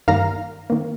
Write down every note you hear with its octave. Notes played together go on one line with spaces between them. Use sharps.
G2 D#3 G3 A#3 F5 A#5
D#3 A#3